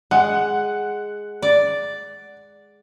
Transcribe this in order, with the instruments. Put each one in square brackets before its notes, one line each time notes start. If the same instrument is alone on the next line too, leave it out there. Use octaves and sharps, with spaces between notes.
[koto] G#3 [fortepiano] F#5
[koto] D5